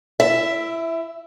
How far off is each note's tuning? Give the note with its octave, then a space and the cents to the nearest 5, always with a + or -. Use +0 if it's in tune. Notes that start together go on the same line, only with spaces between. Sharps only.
E4 +25 E5 +0